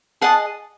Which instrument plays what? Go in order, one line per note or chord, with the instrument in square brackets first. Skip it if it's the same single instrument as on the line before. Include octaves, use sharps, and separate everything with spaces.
[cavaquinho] G#4 D#5 F#5 A5